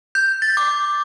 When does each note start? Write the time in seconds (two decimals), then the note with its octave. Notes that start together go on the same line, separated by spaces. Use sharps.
0.15 G6
0.42 A6
0.57 D6